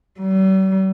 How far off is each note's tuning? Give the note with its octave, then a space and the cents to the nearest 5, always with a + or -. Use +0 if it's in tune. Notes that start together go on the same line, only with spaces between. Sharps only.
G3 -45